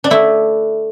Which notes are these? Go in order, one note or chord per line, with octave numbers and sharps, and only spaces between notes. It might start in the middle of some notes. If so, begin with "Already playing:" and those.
D4
A3 E4